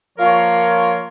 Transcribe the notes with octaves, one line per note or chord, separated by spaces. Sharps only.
F3 A#3 F4 A#4 C#5